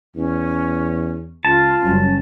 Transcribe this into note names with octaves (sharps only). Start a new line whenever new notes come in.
E2 C#4
C#2 F4 A5
F#1 F#2 G3 C#4